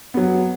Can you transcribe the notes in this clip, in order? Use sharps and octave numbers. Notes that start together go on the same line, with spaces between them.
F#3 B3